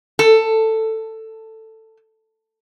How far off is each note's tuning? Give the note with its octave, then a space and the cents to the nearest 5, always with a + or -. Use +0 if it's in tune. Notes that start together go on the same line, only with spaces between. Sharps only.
A4 +10